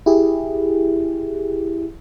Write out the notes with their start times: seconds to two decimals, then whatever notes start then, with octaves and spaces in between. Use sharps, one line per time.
0.06 E4 G4 G#4